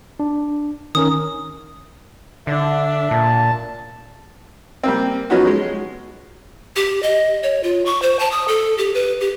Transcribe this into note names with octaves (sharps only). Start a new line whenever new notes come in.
D4
D#3 C#4 A#4 D#6
D3 D4 E5
A#2 A5
G3 A#3 C4
F3 F#3 B3 C#4 D#4 F#4
G#3
G4
D#5
C#5
F4
C#6
C5
A5
D#6
A4
G4
B4
G4